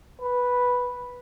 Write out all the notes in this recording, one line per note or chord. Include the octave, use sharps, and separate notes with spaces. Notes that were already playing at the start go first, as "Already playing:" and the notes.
B4